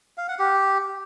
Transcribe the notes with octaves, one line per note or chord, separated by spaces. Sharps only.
F5
F#5
G4